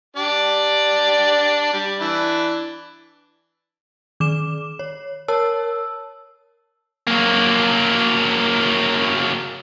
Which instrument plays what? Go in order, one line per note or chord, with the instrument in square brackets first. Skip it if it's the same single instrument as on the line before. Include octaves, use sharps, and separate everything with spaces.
[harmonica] D4 G4 D5
G3
E3 D4 E4
[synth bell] D#3 D6 E7
C#5
A#4 C#5 A5 E6
[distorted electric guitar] F#3 A#3